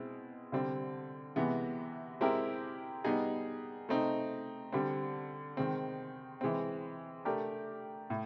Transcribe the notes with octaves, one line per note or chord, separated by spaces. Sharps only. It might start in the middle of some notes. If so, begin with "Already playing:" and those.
Already playing: B2 G#3 C4 E4
D3 G3 C4
C3 E3 G#3 B3
G#3 C4 E4 G4 A#4
G3 B3 D#4 G#4
A3 C4 D#4
D3 G3 C4
D#3 G#3 C4
E3 G#3 C4
A3 D4 G4 A#4
A2